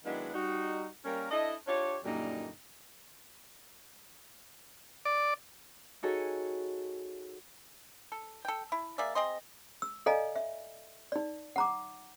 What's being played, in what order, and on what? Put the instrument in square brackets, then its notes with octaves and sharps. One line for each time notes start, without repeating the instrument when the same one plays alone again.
[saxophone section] D#3 F#3 G#3 B3 D4 E4
G3 D#4 F#4
G3 A#3 C#4 A#4
D4 E4 A4 D#5
D4 F4 G4 C#5
F#2 A#2 D3 G3 A#3 D#4
[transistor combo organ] D5
[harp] D#4 F#4 G#4 A4 C#5
[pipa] A4
A4 G5
E4
A#3 G#4 D5 E5
C4 G#4 D#5 C6
[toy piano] E6
A4 D5 D#5 F5 G#5 A#5
E5
D#4 D5
F#5 A#5 D6